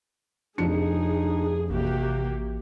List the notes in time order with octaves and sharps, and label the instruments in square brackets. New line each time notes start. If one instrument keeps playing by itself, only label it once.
[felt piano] F1 F2 C#7 [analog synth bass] D4 [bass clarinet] D#4 [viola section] G#4
[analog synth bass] A1 [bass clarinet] C3 [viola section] A#3 F#4 G4